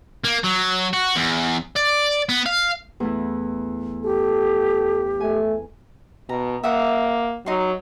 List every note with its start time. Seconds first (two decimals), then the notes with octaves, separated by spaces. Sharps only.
0.24 A#3
0.44 F#3
0.93 F#4
1.16 E2
1.76 D5
2.29 B3
2.46 F5
3.00 E2 A3 E4
4.04 G4 A4
5.20 A3 G#5
6.29 B2 A#5
6.64 A#3 E5 F#5 D#6
7.46 F#3 D#4 C6